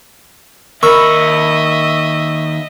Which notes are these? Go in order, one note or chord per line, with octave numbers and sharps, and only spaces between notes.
D#2 A#4 D#5 E5 B5 C#6 E6